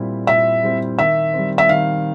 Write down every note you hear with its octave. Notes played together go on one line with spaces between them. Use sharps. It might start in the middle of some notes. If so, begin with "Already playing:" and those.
Already playing: A#2 G3 C4 E4
A#2 E5
G3 C4 E4
D#3 E5
G3 C4
E5
D#3 F5